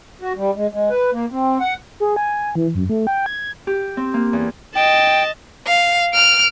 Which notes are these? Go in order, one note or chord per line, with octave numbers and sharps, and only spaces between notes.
F#4
G3
G#3
G#3
B4
A#3
C4
F#5
G#4
G#5
E3
F#2
A3
G5
G#6
G4
C4
A#3
E2
D#5 G5 A5
F5
F6 D7